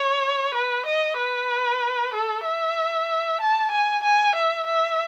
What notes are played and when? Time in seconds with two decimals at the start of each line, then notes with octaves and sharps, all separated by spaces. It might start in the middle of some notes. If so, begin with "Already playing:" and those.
Already playing: C#5
0.54 B4
0.86 D#5
1.18 B4
2.14 A4
2.45 E5
3.41 A5
3.71 G#5
4.04 G#5
4.36 E5
4.67 E5